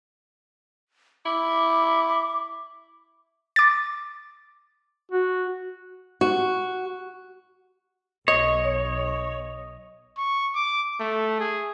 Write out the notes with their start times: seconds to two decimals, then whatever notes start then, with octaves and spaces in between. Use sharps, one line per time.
1.26 E4 D6
3.56 D6 A6
5.12 F#4
6.21 F#4
8.28 B1 C#5 D#5
10.17 C#6
10.55 D6
11.00 A3
11.40 G#4